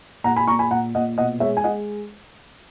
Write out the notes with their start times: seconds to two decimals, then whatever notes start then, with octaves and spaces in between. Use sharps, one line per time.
0.24 A#2 F#5 A#5
0.36 G#5 B5
0.47 A#2 A#5 C#6
0.59 G#5 B5
0.71 A#2 F#5 A#5
0.95 A#2 D#5 F#5
1.18 B2 D#5 F#5
1.40 G#3 C#5 E5
1.57 G#5
1.64 G#3 D#5 F#5